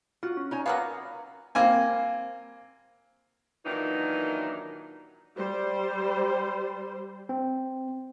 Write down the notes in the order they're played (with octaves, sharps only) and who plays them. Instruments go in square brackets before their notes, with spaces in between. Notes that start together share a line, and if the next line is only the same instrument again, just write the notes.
[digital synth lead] F4 [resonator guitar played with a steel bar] F#4
[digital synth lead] C#4
[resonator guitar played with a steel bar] D#4 C#5 G#5
[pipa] F#3 A#3 B3 [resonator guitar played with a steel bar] F5 [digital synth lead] A#6
[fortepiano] A#3 C4 G#5
[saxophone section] A#2 D#3 E3 F#3 D4 D#4
[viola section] G3 C5
[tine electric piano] C4